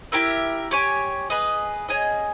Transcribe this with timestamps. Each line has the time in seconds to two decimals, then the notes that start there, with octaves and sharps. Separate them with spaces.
0.12 E4 G4 A#4 E5
0.71 G4 C#5 G#5
1.30 G#4 B4 D#5
1.89 C#4 G#4 D#5 G#5